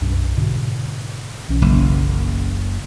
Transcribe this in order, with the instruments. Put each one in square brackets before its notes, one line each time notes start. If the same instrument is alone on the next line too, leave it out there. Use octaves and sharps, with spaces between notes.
[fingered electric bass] B1 F#2 D4
G#2 B2 D3
B1 E3 C#4
[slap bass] F#1